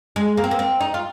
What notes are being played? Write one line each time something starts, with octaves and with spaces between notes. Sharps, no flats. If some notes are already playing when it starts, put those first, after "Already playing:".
G#3
A#3
C4
A#3
C4
D#4
F4